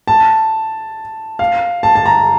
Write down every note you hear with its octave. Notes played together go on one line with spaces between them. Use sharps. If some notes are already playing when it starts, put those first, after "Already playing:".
A5
F5
A5
A5
A#5